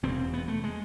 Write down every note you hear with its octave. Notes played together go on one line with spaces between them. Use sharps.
E1 E2 C3 C4
B3
A3
G#3